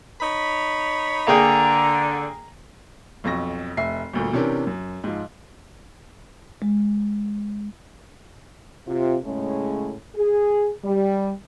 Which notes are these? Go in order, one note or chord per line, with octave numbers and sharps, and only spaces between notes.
D#4 C#5 B5
D3 A#3 G#4 G5 A#5
B1 F2 C#6 A#6
F1 E5 C7
G1 D2 A#2
C3 E3 C#4 D4 G4 A#4
F#2
G#2 F3
G#3
C3 F4
A2 C#3 G#3 A3 C#4
G#4
G3